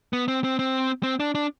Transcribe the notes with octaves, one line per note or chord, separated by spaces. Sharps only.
B3
C4
C4
C4
C4
D4
D4